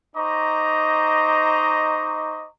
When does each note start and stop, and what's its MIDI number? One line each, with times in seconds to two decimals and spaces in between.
0.15 2.46 63
0.15 2.46 72
0.15 2.46 75
0.15 2.46 82
0.15 2.46 85
0.15 2.46 86